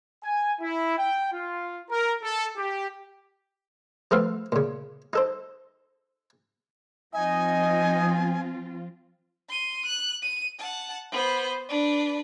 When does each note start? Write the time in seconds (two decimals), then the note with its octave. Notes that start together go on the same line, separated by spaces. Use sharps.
0.22 G#5
0.60 E4
0.97 G5
1.32 F4
1.90 A#4
2.22 A4
2.56 G4
4.11 F3 A3 B3 F4 A4 F5
4.52 A#2 C#3
5.13 D#4 A4 C5
7.14 F3 C4 D#4 F4 D#5 G#5
9.49 C6 D#7
9.85 F#6
10.22 D#7
10.59 F#5 A5
11.11 B3 C5
11.69 D4 B4